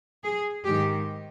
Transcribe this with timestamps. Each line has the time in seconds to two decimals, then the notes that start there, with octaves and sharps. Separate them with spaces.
0.23 G#4
0.65 G#2 D#3 G4